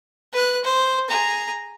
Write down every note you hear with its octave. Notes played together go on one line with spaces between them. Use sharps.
B4 F#6
C5
G#4 A#5